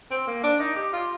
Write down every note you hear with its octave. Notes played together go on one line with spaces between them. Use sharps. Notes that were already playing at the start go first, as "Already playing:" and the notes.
C4
A#3
D4
D#4
G4
F4